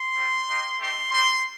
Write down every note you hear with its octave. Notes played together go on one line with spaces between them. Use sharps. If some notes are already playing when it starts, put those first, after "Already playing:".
Already playing: C6
G3 C4 F4
A#3 D#4 G4
A3 C4 D#4 G4 C6
G3 C4 G4 C6